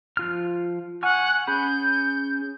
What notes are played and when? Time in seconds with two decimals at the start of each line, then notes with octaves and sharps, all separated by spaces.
0.17 F3 F4 F6
1.03 F#5 G#5 C#6 F6
1.47 C#4 G#4 B5 G6